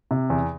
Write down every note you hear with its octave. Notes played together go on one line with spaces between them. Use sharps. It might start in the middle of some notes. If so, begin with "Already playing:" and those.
C3
E2